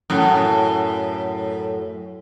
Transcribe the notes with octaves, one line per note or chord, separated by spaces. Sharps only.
F#2 A2